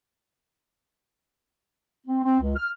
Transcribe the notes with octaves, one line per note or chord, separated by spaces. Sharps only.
C4
C4
C#2
F6